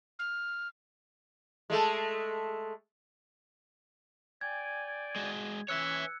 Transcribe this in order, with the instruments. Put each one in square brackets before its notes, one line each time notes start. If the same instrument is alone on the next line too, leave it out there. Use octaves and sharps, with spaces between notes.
[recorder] F6
[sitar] G#3 A3 A4
[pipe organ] D5 G5 G#5 [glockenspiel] G#6
[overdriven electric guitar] G#3 F#4
[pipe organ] E3 C#4 [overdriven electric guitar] C#5 E5 [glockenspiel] E6 F#6 C#7